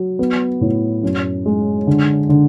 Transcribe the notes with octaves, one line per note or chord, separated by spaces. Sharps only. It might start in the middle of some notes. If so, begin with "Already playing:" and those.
Already playing: F#3
B3
A2
F#2
G#3
D3
D3